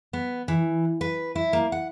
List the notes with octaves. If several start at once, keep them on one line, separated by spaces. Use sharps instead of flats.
B3
E3
B4
E4
A#3
F#5